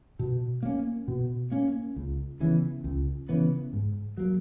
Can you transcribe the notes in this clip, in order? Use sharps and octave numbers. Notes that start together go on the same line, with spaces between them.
B2
A#3 C#4
B2
A#3 C#4
C#2
C#3 E3 B3
C#2
C#3 E3 B3
G#2
F#3 A#3